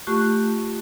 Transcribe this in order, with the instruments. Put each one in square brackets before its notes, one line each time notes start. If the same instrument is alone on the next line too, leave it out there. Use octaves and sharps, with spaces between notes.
[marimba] A3 F4 G4 C#6 F#6